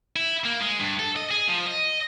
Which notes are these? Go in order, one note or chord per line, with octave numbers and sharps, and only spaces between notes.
E4
A#3
G#3
G2
A4
D#5
G#4
F3
D#5